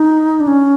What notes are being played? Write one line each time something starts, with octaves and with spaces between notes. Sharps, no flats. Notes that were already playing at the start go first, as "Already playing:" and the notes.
Already playing: D#4
D4
C#4